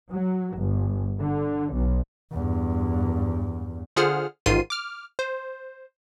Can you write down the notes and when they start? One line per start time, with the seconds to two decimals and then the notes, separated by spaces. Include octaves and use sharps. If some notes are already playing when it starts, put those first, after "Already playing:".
0.10 F#3
0.55 G1
1.19 D3
1.73 B1
2.31 E2 G2
3.96 D3 F4 G#4 C5 F#5 F6
4.46 A1 G#2 D#3 F4 C7 D#7
4.70 D6 F6
5.19 C5